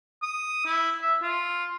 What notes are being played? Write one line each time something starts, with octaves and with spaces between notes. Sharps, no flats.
D#6
E4
E5
F4